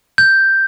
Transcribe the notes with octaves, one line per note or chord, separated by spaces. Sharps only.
G6